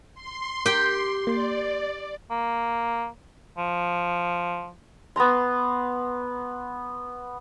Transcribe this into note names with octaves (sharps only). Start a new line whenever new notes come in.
C6
G4 A#4 G5
A#3 D5 C6
A#3
F3
B3 B4 A#5 C6